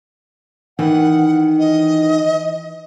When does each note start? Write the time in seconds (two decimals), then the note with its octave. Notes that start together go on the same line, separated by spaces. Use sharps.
0.79 D#3 E3 F#5
1.59 D#5